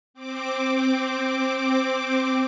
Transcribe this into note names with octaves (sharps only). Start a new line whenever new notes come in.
C4 D6